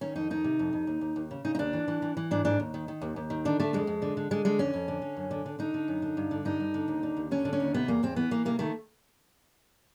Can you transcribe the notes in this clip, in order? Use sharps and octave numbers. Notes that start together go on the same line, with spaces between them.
D#3 C#4
F2 D#4
D#3 D#4
C3
F2
F2
D#2
D#2
D#2
C#3
C#3 D#4
D#4
D#2 D4
E3
E3
E3
E3
G#2 D4
G#2 D4
D#2
D#3
D#3
D#2
D#2
D#3
D3 D4
D3 A3
F2 G#3
F2
D3
D3
D3 G#3
D3 G#3
F2 C#4
F2
D3
D3
F#2
D3
D3
D3 D#4
D3
F#2
D3
G2
D3
G2 D#4
G2
D3
D#2
D3
D#2
D3 C#4
D3
C#4
D#2
C3 B3
E2 A#3
E2 C4
E3 B3
E3 A#3
C3 A#3
D#3 A3